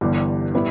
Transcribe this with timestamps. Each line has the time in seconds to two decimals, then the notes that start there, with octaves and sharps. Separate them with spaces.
0.01 G1 G2 E3 G3
0.54 A2 G3 B3 E4